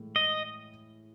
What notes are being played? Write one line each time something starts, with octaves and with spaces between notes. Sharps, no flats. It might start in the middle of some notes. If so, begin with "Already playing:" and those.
Already playing: A2 E3 G#3 E4
D#5